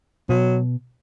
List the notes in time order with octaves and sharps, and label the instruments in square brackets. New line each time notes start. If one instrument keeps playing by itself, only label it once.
[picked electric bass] B2 [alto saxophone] F#3